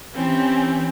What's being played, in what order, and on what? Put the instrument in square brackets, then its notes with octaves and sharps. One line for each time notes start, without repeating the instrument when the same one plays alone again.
[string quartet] E3 C4 C#4 G4